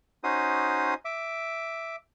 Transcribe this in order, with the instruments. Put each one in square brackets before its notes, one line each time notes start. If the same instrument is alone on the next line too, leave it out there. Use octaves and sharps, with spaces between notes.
[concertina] C#4 D#4 F#4 C5 D#6
E5 D6